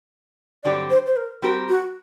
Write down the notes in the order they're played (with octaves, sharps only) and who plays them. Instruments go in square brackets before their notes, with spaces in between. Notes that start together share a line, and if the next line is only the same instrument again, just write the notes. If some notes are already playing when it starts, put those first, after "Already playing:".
[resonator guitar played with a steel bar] G2 D3 F#3 C4 G4 [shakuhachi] D5
[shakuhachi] C5
C5
A#4
[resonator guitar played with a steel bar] G3 C4 G4 A#4 [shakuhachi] F#4
[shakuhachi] F#4